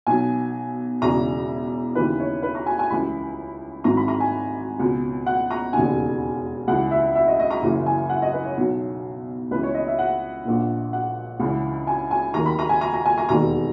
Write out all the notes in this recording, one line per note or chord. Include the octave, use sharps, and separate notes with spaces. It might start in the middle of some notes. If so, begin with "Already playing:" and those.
B1 B2 G#5
E1 E2 C#3 E3 A#5
D#2 C#3 E3 B4
C#5
B4
A#5
G#5
G#5
C#2 C#3 E3 B5
G#1 G#2 E3 A#5
B5
A#5
G#5
C#2 B2
F#5
A#5
E1 D#2 C#3 G#5
C#2 C#3 E3 F#5
E5
E5
D#5
D#5
A#5
F#1 F#2 C#3 E3
G#5
F#5
D#5
B4
C#5
B1 B2
C#2 C#3 E3 B4
C#5
D#5
E5
F#5
A#1 A#2
F#5
C#2 C#3 E3
G#5
G#5
D#2 D#3 A#5
B5
A#5
G#5
A#5
A#5
G#5
A#5
E1 D#2 D#3 A#5